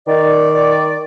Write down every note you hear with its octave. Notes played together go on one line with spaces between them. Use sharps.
D#3 D5